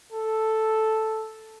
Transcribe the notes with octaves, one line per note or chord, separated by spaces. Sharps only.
A4